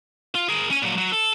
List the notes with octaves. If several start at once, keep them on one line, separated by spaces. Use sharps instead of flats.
F4
G#4 A#4
C#4 G#5
A#2 F#3
F#3
A4